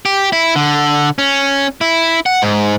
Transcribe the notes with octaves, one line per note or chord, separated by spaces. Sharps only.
G4
E4
D3
C#4
E4
F#5
G#2